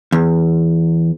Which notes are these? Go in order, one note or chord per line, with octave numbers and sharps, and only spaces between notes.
E2